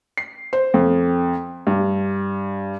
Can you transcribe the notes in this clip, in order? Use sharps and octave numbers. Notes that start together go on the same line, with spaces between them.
C7
C5
F2
G2